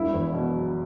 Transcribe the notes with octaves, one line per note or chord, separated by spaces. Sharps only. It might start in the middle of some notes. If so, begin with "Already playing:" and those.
Already playing: E1 A#3 E4
E2
B2
F#3